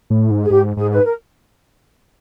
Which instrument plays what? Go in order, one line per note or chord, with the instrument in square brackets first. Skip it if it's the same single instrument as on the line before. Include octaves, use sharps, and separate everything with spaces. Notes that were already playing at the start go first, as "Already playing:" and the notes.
[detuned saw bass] A2
G#2
[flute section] G#4
[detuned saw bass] G#2 [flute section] G4
[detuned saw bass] G#2 [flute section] G#4
[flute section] B4
A#4